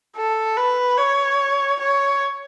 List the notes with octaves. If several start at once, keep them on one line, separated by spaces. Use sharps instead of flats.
A4
B4
C#5
C#5